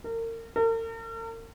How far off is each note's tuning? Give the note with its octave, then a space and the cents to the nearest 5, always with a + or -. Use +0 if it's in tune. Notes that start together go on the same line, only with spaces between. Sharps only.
A#4 -35
A#4 -45